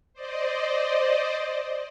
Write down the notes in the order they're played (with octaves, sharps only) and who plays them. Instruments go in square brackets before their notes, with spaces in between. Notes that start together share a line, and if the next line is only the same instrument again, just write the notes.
[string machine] C5 D5 D#5